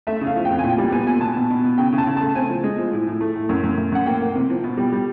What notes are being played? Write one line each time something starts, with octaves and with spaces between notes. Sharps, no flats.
A3 E5
C#3
F5
F3
G5
F2
G#5
A#2 G5
G3
B3 G#5
A#2 G#5
B2 A5
B2
B2
B2
C#3 G5
C#3
A5
C#3
A3 A5
C4 G#5
F3
G#3
F3
A2
A2
A3
A2
F#2
F#2
F#2
F#2 F#5
A#3 G5
A#3
C3
F3
B2
G3
G3